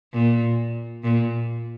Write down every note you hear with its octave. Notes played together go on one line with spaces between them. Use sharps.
A#2
A#2